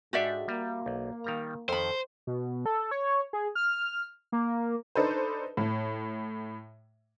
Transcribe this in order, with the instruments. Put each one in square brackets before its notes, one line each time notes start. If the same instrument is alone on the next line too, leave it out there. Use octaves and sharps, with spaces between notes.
[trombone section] G#2 G#3 [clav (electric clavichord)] D4 G4 A4 [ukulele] F#4 D5 E5
[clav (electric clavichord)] G3 [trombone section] A#3
[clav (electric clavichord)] B1
D#3 G3 A#5
[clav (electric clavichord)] F2 D#3 [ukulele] A4 B5 [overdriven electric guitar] C5
[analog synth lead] B2
A4
C#5
G#4
F6
A#3
[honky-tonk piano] D4 D#4 A4 B4 C5
A2